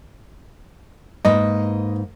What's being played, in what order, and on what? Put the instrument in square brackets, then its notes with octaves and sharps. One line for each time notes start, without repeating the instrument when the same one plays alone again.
[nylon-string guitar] G#2 A#3 B4 [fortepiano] D#5